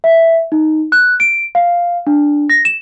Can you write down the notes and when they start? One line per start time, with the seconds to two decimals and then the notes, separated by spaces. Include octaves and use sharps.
0.04 E5
0.52 D#4
0.92 F#6
1.20 D7
1.55 F5
2.07 D4
2.50 A#6
2.65 E7